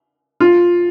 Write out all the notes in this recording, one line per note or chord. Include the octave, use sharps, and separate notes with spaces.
F4